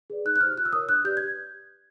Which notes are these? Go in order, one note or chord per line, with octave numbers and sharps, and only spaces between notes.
G#4 B4 D5
D#4 F#6
F#6
G4 C5 F6
F4 F#6
E6
A#4 C#5 D#6
D4 F#6
G4 B4 D5 G6
G4 G#6